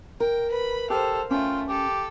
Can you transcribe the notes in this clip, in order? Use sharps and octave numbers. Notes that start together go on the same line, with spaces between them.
A#4 G5
B4 B5
G4 A4 C5 F5
A3 C#4 F4 G5
G4 A4